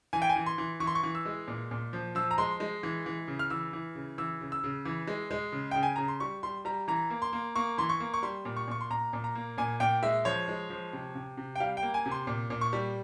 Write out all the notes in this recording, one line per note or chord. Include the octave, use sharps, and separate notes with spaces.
E3 G#5
G5
G#5
E3
C6
E3
E3 C#6
C6
C#6
E3
E6
G#3
A#2
A#2
F3
F3 E6
A#5
G#3 C6
G#3
E3
E3
C#3
F6
E3 E6
E3
C#3
E3 E6
C#3
E6
C#3
E3
G#3
G#3
C#3
C#3 G5
G#5
C#3 A#5
C6
G3 C#6
G3 C6
G3 A#5
E3 A#5
A#3
C6
A#3
A#3 C#6
E3 C6
C#6
A#3
C#6
G3 C6
A#2
C#6
A#2 C#6
C6
A#2 A#5
A#2
A#5
A#3
A#2 G#5
A#2 G5
G#3 E5
F3 C#5
G#3
F3
C3
C3
C3
G5
G3 F5
G5
A#3
G#5
C3
C6
A#2
A#2
C#6
G3